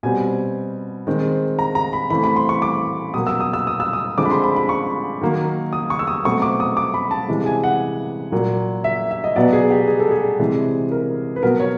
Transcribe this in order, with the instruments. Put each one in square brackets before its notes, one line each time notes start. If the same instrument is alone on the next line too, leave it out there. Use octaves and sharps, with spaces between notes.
[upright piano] B2 G3 C4 G#5
D#3 G#3 C4
A#5
A#5
B5
E3 A3 C4 B5
B5
C6
C#6
D6
B2 F#3 A#3 D#6
E6
D#6
E6
D#6
E6
D#6
D3 F3 G#3 C4 D6
B5
C6
B5
B5
C#6
D#3 F#3 A#3
D#6
C#6
E6
D#6
B2 F#3 A3 C4 C#6
D6
D#6
D6
B5
A5
C3 E3 G#3
G#5
F#5
A#2 F#3 A#3
E5
E5
D#5
B2 F#3 B3 D5
G#4
G4
G#4
A4
G#4
C3 E3 G#3 C4
A#4
B4
B2 F#3 B3 A#4
C#5